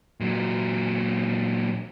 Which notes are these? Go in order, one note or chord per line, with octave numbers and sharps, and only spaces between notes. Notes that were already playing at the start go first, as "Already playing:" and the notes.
A#2 F#3